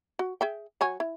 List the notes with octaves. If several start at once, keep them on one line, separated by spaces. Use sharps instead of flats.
F#4
G#4 E5 G5
F#3 C#5 G#5
E4